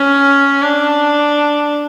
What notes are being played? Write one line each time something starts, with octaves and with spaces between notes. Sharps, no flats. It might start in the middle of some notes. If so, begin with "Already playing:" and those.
Already playing: C#4
D4